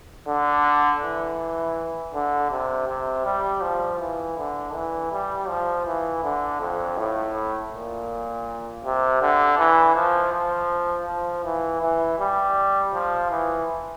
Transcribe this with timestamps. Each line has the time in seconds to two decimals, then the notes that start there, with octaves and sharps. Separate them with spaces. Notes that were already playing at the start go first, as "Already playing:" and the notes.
0.27 D3
1.02 E3
2.14 D3
2.51 C3
2.88 C3
3.26 G3
3.62 F3
4.00 E3
4.38 D3
4.74 E3
5.12 G3
5.49 F3
5.86 E3
6.23 D3
6.61 F2
6.98 A2
7.73 A#2
8.84 C3
9.21 D3
9.59 E3
9.96 F3
10.33 F3
11.07 F3
11.44 E3
11.82 E3
12.19 G3
12.94 F3
13.31 E3